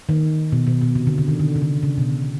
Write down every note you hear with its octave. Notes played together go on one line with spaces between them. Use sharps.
D#3
B2
B2
B2
C3
D3
D3
D#3
D3
C#3
D3
C#3
B2